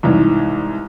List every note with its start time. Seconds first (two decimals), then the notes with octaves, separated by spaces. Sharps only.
0.03 C2 G#2 E3